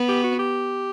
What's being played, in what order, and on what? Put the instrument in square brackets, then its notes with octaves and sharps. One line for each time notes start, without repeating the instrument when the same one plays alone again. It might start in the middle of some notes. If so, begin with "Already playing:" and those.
Already playing: [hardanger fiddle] B3
[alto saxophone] G4
F#4
G4